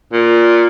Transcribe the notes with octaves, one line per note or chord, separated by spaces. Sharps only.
A#2